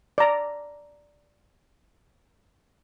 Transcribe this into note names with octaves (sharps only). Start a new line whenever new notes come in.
D5 A#5